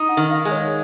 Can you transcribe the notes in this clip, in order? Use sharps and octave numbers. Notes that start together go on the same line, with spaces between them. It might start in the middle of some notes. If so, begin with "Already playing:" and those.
Already playing: D#4 D#6
F#5
D#3
F5
G#3
C#5